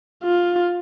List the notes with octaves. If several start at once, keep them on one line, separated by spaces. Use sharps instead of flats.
F4